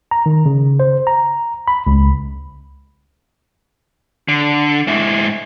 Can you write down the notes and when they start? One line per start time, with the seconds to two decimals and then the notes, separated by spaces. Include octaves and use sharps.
0.11 A#5
0.26 D#3
0.46 C#3
0.80 C5
1.07 A#5
1.68 B5
1.87 C#2
4.28 D3
4.87 G#2 E4